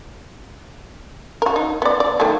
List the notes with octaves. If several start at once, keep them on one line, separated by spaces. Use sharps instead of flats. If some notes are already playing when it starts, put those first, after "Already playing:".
F#4 A#4
D#4
B3 D5
D5
D#3 F#3 A3